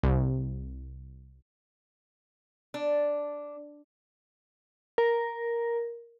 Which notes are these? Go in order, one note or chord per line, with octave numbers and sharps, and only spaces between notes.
C2
D4
A#4